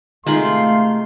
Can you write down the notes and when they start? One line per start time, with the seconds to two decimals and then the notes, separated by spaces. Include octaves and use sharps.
0.27 C3 D#3 G#3 A3 F4 F5 B5 C6